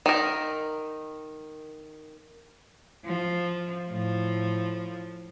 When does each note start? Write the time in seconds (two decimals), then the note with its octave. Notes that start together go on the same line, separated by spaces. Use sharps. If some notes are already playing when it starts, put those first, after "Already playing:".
0.06 D#3 A#4
3.05 F3
3.89 A2 F3